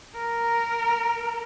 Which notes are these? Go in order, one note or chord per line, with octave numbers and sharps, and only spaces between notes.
A#4